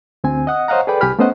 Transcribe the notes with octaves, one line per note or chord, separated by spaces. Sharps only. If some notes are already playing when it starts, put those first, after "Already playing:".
D2 C4 G#5
D#5 F#5 D#6
C5 C#5 D#5 F5 F#5 A#5
G#4 A4 B4 D5 G5 B5
C2 G4 G#5 B5 F6
A3 B3 C#4 C5 D#5 F#5